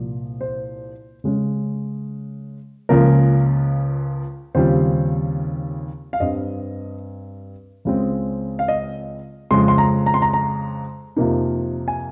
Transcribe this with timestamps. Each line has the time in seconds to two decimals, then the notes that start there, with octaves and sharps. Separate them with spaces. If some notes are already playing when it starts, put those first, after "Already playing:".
Already playing: C2 A#2 F3
0.41 C5
1.24 C#3 G#3 C#4
2.89 C#2 C#3 F3 A#3 A#4
4.55 D#2 C#3 G3 C4 F4 C5
6.13 F5
6.20 G2 G3 C4 D#5
7.85 C#2 C#3 G#3 C4
8.59 F5
8.68 D#5
9.51 F2 C#3 G#3 C6
9.68 C6
9.78 A#5
10.06 A#5
10.14 C6
10.22 A#5
10.33 A#5
11.16 F2 C3 F3 A#3 D#4
11.88 G#5